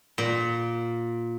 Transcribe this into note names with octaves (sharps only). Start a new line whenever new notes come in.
A#2